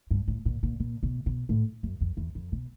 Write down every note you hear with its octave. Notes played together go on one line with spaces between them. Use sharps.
G2
A2
A#2
A#2
A#2
B2
B2
A2
F#2
F2
E2
F2
B2